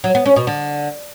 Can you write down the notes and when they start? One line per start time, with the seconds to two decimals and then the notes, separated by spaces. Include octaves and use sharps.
0.04 F#3
0.15 B3
0.26 C#4
0.36 B2
0.47 D3